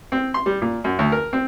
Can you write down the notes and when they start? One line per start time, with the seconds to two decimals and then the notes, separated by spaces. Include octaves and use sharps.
0.12 C4
0.34 C6
0.46 G3
0.62 A#2
0.84 F#2
0.99 D2
1.12 A#4
1.33 C4